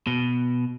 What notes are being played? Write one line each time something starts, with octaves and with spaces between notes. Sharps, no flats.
B2